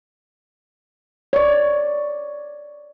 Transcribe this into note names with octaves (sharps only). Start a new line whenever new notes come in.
C#5 D5